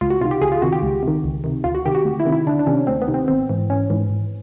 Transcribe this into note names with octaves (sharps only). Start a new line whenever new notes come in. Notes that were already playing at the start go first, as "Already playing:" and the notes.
C#2 F4
F#4
C3 D#3 F4
G4
C#2 G#4
F4
C3 D#3 F#4
G4
C#2
C3 D#3
C#2
C3 D#3
D2 F4
F#4
C3 D#3 G4
F#4
D2
E4
C3 D#3
E4
D2 D4
D4
C3 D#3 C#4
D2 C4
B3
C3 D#3
C4
G#1 C4
G#2 E3
G#1 C#4
G#2 E3
G#1